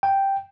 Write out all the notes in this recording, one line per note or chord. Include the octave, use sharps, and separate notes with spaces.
G5